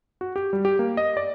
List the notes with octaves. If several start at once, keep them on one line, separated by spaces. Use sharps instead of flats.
F#4
G4
G3
G4
A#3
D#5
D5